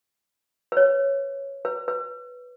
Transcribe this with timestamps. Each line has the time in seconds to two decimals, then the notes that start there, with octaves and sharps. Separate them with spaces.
0.72 B4
0.77 C#5
1.65 B4
1.88 B4